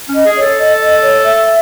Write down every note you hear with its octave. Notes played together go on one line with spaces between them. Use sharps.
C#4
D#5
G#4
C#5
A4
D#5
D#5
C#5
E5